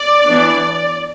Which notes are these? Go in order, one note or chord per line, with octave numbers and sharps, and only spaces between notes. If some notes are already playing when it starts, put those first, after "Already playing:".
Already playing: D5
E3 B3 D4